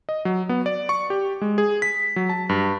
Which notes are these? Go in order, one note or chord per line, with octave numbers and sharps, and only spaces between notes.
D#5
F#3
B3
D5
C#6
G4
G#3
G#4
B6
F#3
A5
G2